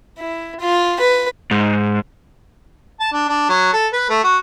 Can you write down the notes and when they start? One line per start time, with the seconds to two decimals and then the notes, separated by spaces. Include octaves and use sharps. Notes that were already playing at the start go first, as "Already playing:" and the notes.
0.18 E4
0.60 F4
1.00 B4
1.51 G#2
3.00 A5
3.12 D4
3.29 D4
3.49 F#3
3.73 A4
3.93 B4
4.10 A3
4.24 F#4